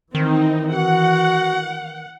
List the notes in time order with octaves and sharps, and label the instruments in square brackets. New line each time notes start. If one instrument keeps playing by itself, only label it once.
[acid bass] D#3 [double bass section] E3 [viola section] C4 D#4
[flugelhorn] F#4 [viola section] F#5